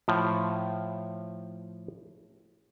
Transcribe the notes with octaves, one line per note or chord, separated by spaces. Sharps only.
A2 F3